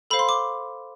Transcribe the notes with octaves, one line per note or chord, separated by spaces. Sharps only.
A4 C5 F5 B5
C6
D6